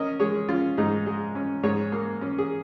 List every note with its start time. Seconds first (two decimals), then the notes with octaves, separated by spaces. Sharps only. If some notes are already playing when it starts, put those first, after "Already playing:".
Already playing: C#4 A#4 D#5
0.20 G#3 G#4 C#5
0.49 C#4 F4
0.77 G#2 D#4 G#4
1.06 G#3
1.35 C#4
1.63 G#2 G#4 C#5
1.92 A#3
2.21 C#4
2.38 G#4